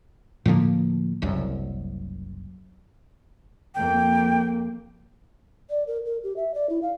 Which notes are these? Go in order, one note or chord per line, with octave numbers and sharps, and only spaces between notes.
A2 D3 F3 A#3
F#1 C2 F#2
F2 A#3 G5
D5
A#4
A#4
G4
E5
D5
E4
F5